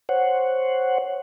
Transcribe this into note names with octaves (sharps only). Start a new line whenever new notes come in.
C5 C#5 F#5